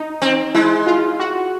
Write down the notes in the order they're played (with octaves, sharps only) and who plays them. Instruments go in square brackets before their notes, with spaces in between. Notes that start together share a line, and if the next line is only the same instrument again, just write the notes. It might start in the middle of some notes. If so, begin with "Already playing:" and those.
Already playing: [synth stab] D#4
[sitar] C4
[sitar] G#3 [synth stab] E4
[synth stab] F4
F#4